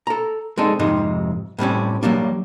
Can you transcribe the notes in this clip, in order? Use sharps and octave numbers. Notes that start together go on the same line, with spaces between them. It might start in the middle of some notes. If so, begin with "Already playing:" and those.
A4 A#5
G#3 C4 D4 D#4 A4
F2 G#2 C3 F3 D#4
A2 G3 C4 C#4
F#3 G3 A#3 D4